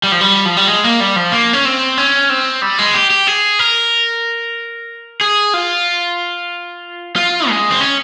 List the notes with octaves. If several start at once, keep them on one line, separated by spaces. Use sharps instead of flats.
G3
F3
G3
F3
G3
G#3
A#3
G3
F3
A#3
C#4
C4
C#4
C4
G3
G#3
G4
G4
G#4
A#4
G#4
F4
F4
G#3
C4
C#4